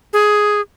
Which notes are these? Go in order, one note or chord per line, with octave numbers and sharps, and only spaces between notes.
G#4